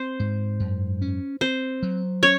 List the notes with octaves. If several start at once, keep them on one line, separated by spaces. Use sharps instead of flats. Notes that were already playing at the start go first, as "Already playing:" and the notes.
Already playing: C4 C5
G#2
F#2
C#4
C4 C5
F#3
C#4 C#5